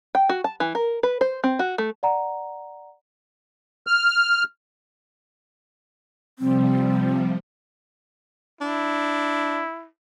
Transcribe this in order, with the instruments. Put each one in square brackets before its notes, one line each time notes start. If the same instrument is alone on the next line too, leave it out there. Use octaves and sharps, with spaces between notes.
[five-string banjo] G5
F#4
A5
E3
A#4
B4
C5
C4
F#4
A3
[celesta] D5 F#5 A#5
[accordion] F6
[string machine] C3 F3 G3 [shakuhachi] C4
[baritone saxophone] D4 [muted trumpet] E4